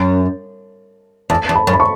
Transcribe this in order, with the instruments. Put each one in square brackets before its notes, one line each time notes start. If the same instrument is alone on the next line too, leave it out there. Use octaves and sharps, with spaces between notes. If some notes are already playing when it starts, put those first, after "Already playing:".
Already playing: [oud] F#2
[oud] E2 [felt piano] A5
[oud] E2
[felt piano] B5
[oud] F#2
[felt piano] B5
C#6